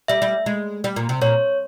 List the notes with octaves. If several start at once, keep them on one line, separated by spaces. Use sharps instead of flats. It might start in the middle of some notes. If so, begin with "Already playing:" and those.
G3 E5
G3
G#3
G3
A#2
C3
A#2 C#5